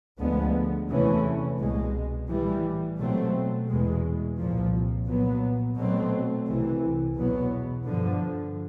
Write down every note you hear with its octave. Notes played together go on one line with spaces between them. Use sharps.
D2 D3 F3 G#3 B3
E2 C3 E3 A3 C#4
C2 B2 G#3
A2 E3 G3
B2 F#3 A3 C4
E2 B2 G#3
C2 A#2 F3
A#2 F#3 B3
B2 F#3 A3 C4
C2 C3 E3
E2 B2 F#3 B3
G2 D3 F3